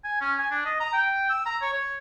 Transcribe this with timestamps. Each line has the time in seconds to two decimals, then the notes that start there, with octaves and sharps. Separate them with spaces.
0.04 G#5
0.21 C#4
0.38 G#5
0.51 D4
0.65 D#5
0.80 A#5
0.93 G5
1.30 E6
1.46 A#5
1.62 C#5
1.73 C#5